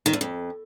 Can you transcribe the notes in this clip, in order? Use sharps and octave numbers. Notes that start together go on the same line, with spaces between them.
D#3
E2
F2